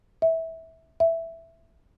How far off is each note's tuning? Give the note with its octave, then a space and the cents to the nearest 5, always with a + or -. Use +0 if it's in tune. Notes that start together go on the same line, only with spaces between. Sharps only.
E5 -20
E5 +5